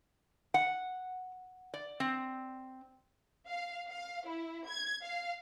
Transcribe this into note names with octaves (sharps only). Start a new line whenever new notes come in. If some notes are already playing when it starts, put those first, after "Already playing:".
F#5
D5
C4
F5
F5
E4
G#6
F5